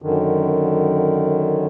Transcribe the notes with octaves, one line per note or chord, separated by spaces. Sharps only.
F#2 D3 D#3